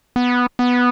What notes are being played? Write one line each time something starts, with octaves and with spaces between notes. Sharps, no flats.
B3
B3